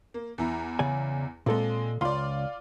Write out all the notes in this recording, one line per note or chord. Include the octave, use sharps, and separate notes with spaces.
A#3
E2 E4 A#5
C#3 D5 G#5
A#2 G#3 C4 A4
C#2 F4 D5 C6